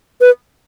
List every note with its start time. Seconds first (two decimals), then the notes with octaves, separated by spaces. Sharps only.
0.21 B4